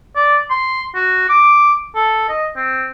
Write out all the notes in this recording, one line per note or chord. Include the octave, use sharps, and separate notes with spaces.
D5
C6
F#4
D6
A4
D#5
C4